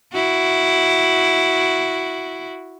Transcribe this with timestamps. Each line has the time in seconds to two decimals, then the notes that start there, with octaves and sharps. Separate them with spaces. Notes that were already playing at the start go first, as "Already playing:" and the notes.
0.13 E4 F#4